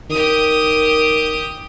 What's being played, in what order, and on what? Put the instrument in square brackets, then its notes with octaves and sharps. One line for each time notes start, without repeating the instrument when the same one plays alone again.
[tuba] D#3 [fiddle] G4 D#6